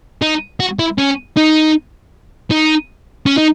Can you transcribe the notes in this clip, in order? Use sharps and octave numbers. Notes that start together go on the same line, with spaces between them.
D#4
F#4
E4
C#4
D#4
D#4
C#4
D#4